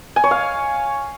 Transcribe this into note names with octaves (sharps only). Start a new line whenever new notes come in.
G#5
C#5
F5